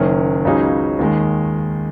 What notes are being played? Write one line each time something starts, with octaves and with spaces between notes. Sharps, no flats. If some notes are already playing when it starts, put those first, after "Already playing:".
Already playing: F#1 F#2 D#3 A#3 C#4
C#2 C#3 F#3 D#4 G#4
D#2 D#3 G#3